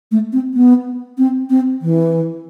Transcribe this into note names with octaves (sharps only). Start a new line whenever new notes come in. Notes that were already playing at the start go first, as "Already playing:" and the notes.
A3
C4
B3
C4
C4
E3